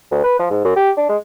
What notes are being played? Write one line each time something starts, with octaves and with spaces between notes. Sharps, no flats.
D2
B4
F3
G#2
F#2
G4
D4
G#3